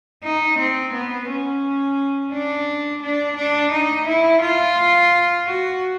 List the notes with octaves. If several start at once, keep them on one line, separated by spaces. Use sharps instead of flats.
D#4
C4
B3
C#4
D4
D4
D4
D#4
E4
F4
F#4